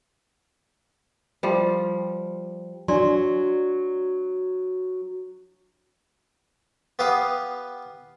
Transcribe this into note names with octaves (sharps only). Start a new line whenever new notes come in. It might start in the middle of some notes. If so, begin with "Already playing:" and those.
F3 G3
F#3 D4 D5 C6
B3 G4 B4 F5 D#6